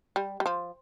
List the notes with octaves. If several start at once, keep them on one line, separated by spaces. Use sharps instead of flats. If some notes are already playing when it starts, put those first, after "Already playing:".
G3
G3
F3